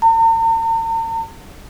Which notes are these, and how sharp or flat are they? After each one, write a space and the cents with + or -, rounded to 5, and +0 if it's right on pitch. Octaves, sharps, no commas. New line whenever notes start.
A#5 -45